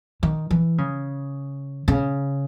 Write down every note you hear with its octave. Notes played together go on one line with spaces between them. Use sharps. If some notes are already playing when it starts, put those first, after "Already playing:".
D#3
E3
C#3
C#3